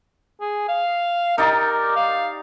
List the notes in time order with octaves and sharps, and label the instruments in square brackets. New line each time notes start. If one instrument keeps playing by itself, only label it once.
[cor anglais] G#4
F5
[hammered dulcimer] D#4 G4 D5 [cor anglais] A#4
[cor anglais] F5